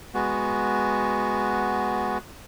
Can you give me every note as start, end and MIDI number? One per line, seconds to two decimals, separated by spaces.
0.14 2.18 56
0.14 2.18 59
0.14 2.18 66